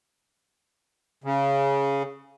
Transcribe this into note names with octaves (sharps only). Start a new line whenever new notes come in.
C#3